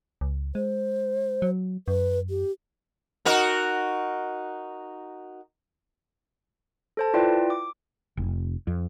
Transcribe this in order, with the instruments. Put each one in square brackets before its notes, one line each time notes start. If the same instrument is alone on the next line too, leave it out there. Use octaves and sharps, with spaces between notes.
[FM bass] C#2
[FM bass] G#3 [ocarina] C5
[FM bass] F#3
[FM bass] F#2 [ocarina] B4
[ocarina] G4
[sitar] D#4 F#4 A#4
[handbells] A4 C5 A5
E4 F4 B4 D5 G5
D6
[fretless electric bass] F1
F2